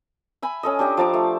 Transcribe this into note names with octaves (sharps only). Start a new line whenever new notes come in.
E5 G#5 B5
C#4 A4 D#5
D4 G4 D#5
F3 A5 A#5 D6
A3